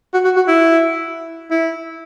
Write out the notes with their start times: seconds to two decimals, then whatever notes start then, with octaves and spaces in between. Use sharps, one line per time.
0.14 F#4
0.25 F#4
0.37 F#4
0.48 E4
1.51 E4